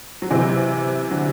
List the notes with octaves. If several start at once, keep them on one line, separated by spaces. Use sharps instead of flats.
F#3
C3 E3
D3 F#3